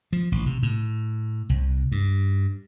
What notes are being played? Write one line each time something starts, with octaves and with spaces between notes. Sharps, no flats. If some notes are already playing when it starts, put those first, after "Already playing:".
F3
A1
C3
A2
C2
G2